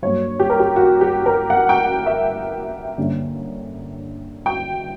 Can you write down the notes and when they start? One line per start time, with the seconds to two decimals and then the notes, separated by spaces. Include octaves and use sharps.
0.02 G2 F#3 A#3 C#5
0.40 G4
0.50 A#4
0.60 G4
0.76 F#4
1.01 G4
1.26 A#4
1.50 F#5
1.69 G5
1.87 F#5
2.06 E5
2.98 G2 D3 A#3 C#4
4.46 G5